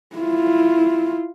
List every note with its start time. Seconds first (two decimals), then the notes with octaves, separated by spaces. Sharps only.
0.16 E4 F4